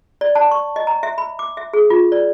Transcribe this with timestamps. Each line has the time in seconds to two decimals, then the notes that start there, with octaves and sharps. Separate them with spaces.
0.21 D5
0.35 A5
0.51 C#6
0.76 D#5
0.87 A#5
1.03 E5
1.18 B5
1.39 D6
1.57 E5
1.73 G#4
1.90 F4
2.12 D5